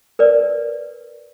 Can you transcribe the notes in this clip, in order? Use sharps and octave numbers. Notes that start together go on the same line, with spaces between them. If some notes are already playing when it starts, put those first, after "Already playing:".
A#4 B4 D5